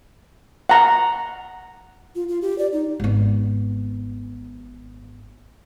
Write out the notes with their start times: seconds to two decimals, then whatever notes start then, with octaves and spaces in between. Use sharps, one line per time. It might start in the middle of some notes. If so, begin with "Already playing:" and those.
0.69 F#5 A#5
2.15 F4
2.28 F4
2.42 G4
2.59 D5
2.72 D#4
3.00 G#1 B3